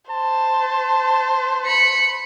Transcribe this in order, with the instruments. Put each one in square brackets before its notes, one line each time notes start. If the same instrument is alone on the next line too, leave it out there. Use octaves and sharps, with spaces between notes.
[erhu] C5 [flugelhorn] A5
[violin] B5 C#7